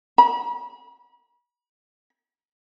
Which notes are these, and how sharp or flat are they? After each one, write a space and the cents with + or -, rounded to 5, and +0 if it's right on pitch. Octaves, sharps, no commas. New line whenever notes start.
B5 -35